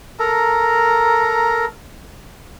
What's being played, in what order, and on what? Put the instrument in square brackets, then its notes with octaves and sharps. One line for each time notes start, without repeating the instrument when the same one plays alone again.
[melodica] A4 A#4 A#5